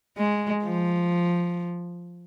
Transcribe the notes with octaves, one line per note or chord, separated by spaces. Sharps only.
G#3
F3